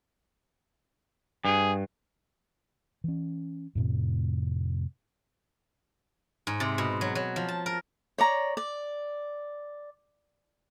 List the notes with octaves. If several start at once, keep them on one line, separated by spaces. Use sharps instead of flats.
G2 G#4
E3 C#4
F2 A2 C3
G#2
C3
B2
F#3
F#3
F3
A5
A#4
C#5 D5 A#5
D5